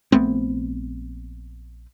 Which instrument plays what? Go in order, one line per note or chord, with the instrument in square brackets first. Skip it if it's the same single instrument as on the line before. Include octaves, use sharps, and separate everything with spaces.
[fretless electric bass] A#1 A3 B3 C4